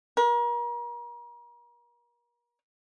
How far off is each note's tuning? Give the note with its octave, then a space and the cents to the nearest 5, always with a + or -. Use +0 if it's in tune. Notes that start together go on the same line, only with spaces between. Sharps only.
A#4 +40